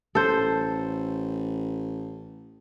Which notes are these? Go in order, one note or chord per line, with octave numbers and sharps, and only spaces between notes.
A1 A4 C5